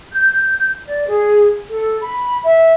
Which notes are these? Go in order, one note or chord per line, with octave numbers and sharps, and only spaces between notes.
G6
D5
G#4
A4
B5
E5